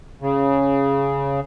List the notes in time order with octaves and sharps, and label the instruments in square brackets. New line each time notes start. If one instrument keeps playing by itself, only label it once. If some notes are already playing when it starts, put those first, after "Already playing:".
[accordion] C#3